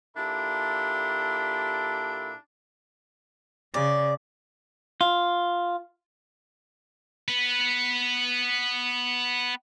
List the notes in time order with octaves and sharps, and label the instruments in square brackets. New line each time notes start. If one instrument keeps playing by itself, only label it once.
[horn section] A#2 D4 E4 G4 A4 B5
[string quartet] C#3 [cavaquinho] D5
[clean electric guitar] F4
[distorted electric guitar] B3 B4